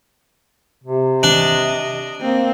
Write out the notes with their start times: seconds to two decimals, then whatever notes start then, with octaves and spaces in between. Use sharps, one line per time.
0.83 C3
1.23 D4 D#5
2.21 A#3 C4